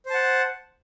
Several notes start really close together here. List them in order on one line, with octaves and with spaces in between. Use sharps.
C5 A5 F#5